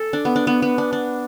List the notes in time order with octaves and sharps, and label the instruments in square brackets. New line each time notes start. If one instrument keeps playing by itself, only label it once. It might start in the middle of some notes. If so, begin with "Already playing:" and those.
Already playing: [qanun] A4
D4
B3
D4
B3
B3
D4
D4